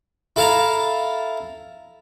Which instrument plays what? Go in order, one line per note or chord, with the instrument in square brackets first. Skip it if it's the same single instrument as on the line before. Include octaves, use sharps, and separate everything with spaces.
[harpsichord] E4 A4 F5 A5 A#5